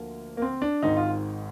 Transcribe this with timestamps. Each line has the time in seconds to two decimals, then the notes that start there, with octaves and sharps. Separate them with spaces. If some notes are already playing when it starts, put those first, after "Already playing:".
Already playing: D2 D3 F3 A#3
0.37 A#3
0.42 C4
0.62 D4
0.82 G#1 G#2 D#3 D#4
0.96 F4